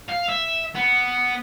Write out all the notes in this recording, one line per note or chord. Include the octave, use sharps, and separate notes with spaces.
F5
E5
B3